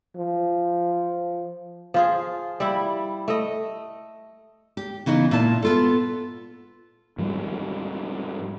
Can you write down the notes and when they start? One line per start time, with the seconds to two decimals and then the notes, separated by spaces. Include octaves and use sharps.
0.17 F3
1.94 F3 F4 G#4
2.60 G3 E4
3.28 A3 D#5
4.77 G4
5.06 C#3 E3 B3 D#4
5.31 A#2 E4 F4 A5
5.63 B3 F4 A4
7.18 G#2 F3 G3